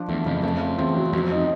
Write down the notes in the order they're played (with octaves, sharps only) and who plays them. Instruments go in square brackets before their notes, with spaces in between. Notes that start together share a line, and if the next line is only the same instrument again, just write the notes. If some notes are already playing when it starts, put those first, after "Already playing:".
Already playing: [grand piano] F3 D4
[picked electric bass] E2 [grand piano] A3
[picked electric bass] F2 [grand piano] C#3
[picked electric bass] F2 [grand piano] A3
[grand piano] F4
[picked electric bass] E2 [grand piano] C4
[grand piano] F#3
[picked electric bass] F2 [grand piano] F#3
[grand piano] D#4